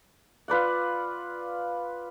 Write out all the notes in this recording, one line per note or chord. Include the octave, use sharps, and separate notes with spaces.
F4 B4 D5 F#5